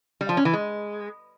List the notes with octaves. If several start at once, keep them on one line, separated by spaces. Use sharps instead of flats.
G3
F3
C#4
E3
G#3